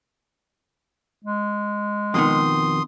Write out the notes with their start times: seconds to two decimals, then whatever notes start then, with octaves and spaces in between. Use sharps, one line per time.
1.25 G#3
2.14 F2 B2 D#3 C6 D#6